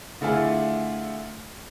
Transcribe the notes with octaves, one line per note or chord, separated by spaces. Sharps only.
D3 A3 E4 F4 G#4